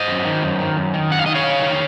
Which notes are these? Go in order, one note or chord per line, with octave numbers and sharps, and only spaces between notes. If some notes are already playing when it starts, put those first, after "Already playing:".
Already playing: C5 D#5
F#2
D#3
F#2
D#3
F#2
D#3
F#2 F#5
F5
D#3 D#5
C#5 F5
F#2
D#3